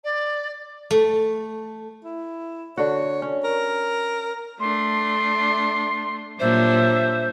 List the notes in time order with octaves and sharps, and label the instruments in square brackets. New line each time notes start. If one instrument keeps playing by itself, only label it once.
[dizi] D5
[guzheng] A3
[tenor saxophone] E4
[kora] D3 F#4 [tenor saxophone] C#5
[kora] C#4
[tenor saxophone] A#4
[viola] A3 D4 [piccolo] C6
[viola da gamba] A#2 F#3 G3 [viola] D4 [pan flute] C5 [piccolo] E5